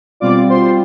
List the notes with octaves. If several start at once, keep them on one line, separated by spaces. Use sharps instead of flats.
B2 G3 C4 F4 D5 D6
C5 C6